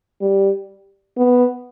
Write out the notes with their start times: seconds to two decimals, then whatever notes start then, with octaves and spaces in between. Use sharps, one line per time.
0.21 G3
1.17 B3